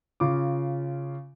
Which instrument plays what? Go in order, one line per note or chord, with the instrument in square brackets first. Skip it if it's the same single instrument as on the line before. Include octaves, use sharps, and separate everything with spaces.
[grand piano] C#3 F4 D6